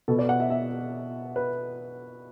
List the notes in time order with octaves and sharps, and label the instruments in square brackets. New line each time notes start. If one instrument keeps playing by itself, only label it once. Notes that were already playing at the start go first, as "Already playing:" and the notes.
[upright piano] B2 B3 A4
D5
F#5
E5
E5
B4